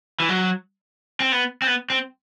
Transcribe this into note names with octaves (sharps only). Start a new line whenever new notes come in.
E3
F#3
C4
B3
C4
B3
C4